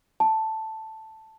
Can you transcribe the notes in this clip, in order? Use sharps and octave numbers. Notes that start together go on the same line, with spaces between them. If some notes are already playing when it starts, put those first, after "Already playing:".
A5